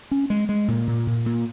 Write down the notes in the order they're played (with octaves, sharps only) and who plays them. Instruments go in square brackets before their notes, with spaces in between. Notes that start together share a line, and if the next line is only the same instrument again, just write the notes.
[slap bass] C#4
G#3
G#3
A#2
A#2
A#2
A#2